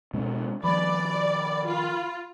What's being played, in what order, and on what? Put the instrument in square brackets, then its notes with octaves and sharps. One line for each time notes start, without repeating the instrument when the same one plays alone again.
[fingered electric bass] B2 G#3 C4
[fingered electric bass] D#3 F3 [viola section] D5 [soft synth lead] B5
[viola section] F4